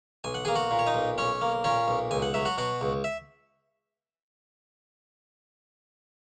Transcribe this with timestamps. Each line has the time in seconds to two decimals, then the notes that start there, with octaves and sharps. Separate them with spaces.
0.24 B1 G#5
0.34 F#5
0.45 G#4 G#5
0.48 A#3
0.55 F#4 F#5
0.71 A#2
0.79 C#5
0.87 D#4 D#5
0.94 B1
1.18 B1 C#4 C#5
1.41 A#3
1.64 A#2 C#4 C#5
1.88 B1
2.11 C#2 G#5
2.22 F#5
2.34 F#3 E5
2.45 F#4 F#5
2.58 B2 F#4 F#5
2.81 C#2
3.04 E5